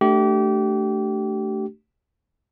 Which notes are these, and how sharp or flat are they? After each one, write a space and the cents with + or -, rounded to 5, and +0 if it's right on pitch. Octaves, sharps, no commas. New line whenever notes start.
A3 +0 D4 +0 G4 -30